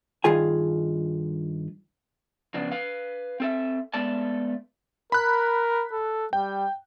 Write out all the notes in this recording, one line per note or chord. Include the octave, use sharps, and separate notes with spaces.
G2 D#3 F4 G#4 G#5
F2 C#3 B3 D4
B4 F5
C4 A4 E5
G#3 A3 B3 A4 D5 A5
A#4 B5 F#6
A4
G3 G5